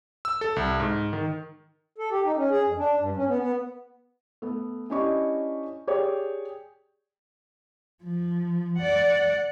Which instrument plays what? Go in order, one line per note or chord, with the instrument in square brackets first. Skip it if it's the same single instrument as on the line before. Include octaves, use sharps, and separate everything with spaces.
[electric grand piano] E6
A4
C2
G#2
D#3
[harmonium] A4
G4
D#4
C#4
G#4
F2
D4
G2
C#4
B3
B3
[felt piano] A3 B3
C#4 D4 E4 G4 D#5 C#6
G4 G#4 C#5 D5 G5
[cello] F3
D5 F#5